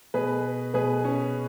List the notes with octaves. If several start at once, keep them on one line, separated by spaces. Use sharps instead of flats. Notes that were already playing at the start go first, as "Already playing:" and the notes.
B2 G#4 B4
B2 G#4 B4
C#4